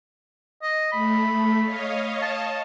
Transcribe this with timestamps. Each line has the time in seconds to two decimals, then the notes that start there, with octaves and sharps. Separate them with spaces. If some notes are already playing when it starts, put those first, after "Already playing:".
0.62 D#5
0.92 A3 B5
1.65 C#5 D#5 F5
2.22 A5